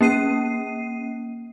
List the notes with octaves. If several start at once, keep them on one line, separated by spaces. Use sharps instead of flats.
A#3 C#4 C7 D#7